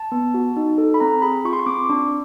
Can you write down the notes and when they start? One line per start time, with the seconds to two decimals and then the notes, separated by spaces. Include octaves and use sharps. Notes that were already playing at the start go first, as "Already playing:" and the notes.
Already playing: A5
0.12 B3
0.34 F#4
0.57 D#4
0.78 A4
0.94 B5
1.00 C4 A#5
1.22 G#4 B5
1.45 F4 C#6
1.53 C6
1.59 C#6
1.66 C4 D6
1.89 D4